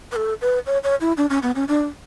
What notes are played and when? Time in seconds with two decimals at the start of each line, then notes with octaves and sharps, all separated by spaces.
0.12 B4
0.16 A4
0.41 B4
0.67 C#5
0.84 C#5
1.01 E4
1.17 D4
1.30 C#4
1.43 B3
1.56 C#4
1.68 D4